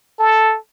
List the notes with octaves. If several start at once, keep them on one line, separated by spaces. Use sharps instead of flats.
A4